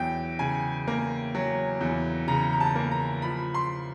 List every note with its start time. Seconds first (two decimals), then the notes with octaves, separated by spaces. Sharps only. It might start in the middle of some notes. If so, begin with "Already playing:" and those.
Already playing: E2 F#3 G5
0.39 C#3 G#5
0.87 A#3
1.35 F#3
1.81 E2
2.28 C#3 A#5
2.53 A#5
2.60 A5
2.75 A#3
2.91 A#5
3.22 F3 B5
3.54 C6